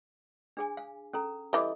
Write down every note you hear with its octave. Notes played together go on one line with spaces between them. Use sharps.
D4 G#4 G#5
F5
C#4 A4 A#5
E3 G3 A4 D#5